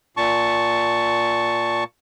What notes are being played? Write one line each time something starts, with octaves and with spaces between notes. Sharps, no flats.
A#2 A5 C#6